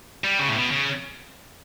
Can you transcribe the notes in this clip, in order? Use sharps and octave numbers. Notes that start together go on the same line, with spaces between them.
G3
C#3
A2
B2
C#3